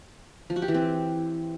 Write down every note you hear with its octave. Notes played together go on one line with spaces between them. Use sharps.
F3
F#4
G4
E3
C4